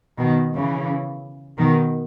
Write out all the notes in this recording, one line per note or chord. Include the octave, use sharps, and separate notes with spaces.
B2 D#3
C#3 E3
B2 D#3